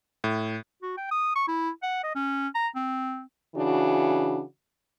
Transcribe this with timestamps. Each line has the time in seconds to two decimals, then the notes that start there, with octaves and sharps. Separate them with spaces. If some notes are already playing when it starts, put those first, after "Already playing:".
0.24 A2
0.83 F#4
0.97 G5
1.11 D#6
1.36 C#6
1.48 E4
1.83 F#5
2.03 D#5
2.15 C#4
2.55 A#5
2.75 C4
3.56 C#3 E3 D4 F#4